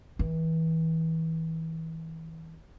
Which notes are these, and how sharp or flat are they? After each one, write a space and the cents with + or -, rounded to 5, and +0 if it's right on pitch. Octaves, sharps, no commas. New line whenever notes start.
E3 -30